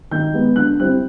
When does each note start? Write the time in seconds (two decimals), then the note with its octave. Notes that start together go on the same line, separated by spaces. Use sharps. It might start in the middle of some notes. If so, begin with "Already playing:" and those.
0.11 D#3 G6
0.33 G#3 B3
0.56 D3 F#6
0.80 G3 C4 E4 F#6